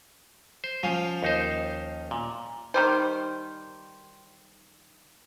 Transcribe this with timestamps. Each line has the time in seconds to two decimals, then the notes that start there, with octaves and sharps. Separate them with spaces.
0.64 C5
0.83 F3 C#4
1.23 D#2 D#4 C5
2.11 A#2
2.74 D#3 G3 C5